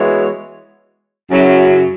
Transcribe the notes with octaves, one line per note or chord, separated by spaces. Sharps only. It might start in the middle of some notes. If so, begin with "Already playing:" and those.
Already playing: E3 G#3 B3 F#4 C#5
F#2 C#3 F#3 E4